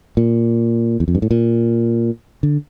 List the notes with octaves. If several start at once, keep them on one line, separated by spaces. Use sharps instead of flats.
A#2
E2
F2
G2
A2
A#2
D3